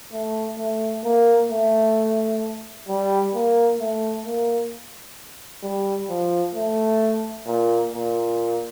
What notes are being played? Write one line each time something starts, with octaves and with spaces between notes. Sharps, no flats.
A3
A3
A#3
A3
G3
A#3
A3
A#3
G3
F3
A3
A#2
A#2